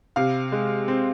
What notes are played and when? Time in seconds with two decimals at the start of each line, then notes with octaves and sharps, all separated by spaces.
0.16 C3 F5
0.52 G#3
0.88 C4